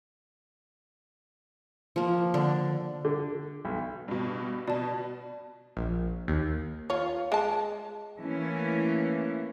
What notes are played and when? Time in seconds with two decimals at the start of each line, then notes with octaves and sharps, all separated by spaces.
1.96 F3 A#3
2.34 D3 D4
3.05 D3
3.65 B1
4.08 G2 B2
4.68 B2 D5 A5
5.77 A#1
6.28 D#2
6.90 F4 C#5
7.32 G#3 A5
8.20 E3 A3 A#3 C#4